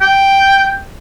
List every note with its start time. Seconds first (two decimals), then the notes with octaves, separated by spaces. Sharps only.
0.01 G5